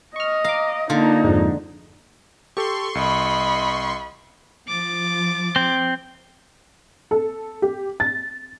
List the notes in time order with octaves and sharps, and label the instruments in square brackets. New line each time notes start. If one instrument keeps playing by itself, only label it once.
[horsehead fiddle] D#5 [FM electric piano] C#6 F6
[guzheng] F5 [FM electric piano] A#5 D6
[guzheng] D3 [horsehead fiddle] A#3 D#4 [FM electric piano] F4
[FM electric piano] F2 G#2
[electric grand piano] G4 A4 [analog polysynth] C6 C#6
[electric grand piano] C2 [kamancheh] D#5 B5
[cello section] F3 [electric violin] D6 A6
[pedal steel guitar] C4
[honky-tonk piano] A4
G4
A6